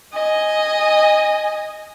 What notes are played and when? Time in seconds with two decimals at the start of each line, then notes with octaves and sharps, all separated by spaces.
0.14 D#5 G#5